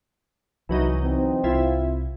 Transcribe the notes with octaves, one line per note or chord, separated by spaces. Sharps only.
C2 E3 F#3 D#4
C4
C2 E4 F4